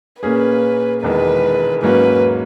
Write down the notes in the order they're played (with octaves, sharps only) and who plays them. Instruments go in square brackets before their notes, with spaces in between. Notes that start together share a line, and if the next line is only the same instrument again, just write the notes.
[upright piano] A#2 A#3 C#4 G#4 [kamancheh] B4
[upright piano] E1 E2 D#3 G#3 [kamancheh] B4
[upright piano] G#2 F#3 A#3 C#4 [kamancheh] B4